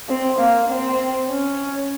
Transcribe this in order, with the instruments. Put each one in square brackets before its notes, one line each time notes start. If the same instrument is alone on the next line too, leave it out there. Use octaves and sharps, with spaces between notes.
[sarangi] C4
A#3
C4
C#4